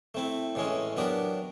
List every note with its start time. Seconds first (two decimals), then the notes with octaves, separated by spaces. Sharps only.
0.14 A3 C4 E4
0.55 A2 E3 G#3 C#4
0.97 F#3 B3 D4 G4 A#4